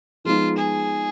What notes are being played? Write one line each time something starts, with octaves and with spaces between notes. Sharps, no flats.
F3 G#3 B3 D#4 F4
G#4